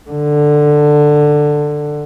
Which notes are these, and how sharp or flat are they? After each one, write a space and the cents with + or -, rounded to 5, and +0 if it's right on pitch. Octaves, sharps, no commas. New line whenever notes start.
D3 +10